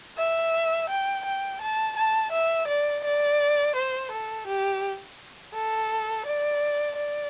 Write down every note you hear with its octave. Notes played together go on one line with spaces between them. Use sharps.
E5
G5
G5
A5
A5
E5
D5
D5
C5
A4
G4
A4
D5
D5